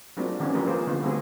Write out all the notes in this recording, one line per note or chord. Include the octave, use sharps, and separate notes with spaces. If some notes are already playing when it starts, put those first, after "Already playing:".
F#3 G#3 A#3 C4 D4 F4
D#3 E3 A#3 C4 C#4 E4
F3 F#3 A#3 G4 A#4 B4
A#3 F4 G#4 C5
D3 B3 F4
G3 A3 C4 E4 F#4 G#4